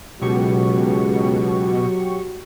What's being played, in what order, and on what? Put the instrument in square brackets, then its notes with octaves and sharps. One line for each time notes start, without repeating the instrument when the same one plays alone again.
[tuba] C#2 [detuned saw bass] B2 [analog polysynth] F#3 G4 C#6 [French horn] F#4